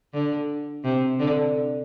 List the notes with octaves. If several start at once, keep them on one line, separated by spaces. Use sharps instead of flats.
D3
C3
D3